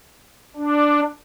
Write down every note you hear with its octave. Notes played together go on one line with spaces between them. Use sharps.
D4